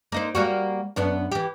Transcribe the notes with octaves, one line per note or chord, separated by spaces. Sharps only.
A#3 D#4 C5
G3 A#3 F#4
F#2 B3 D4
E3 G4